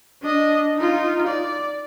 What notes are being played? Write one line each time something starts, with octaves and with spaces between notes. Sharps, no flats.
D4 D#5
D#4 F4
D5